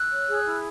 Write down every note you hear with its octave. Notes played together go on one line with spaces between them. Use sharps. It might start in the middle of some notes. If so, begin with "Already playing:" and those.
Already playing: E6 F#6
C#5
G#4
E4